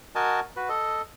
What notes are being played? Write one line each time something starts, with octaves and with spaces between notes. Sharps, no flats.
F#4 A#4 D#5 G#5 A5
F#4 B4
A4 D#5